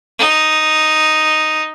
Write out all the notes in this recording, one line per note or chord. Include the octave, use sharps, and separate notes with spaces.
D#4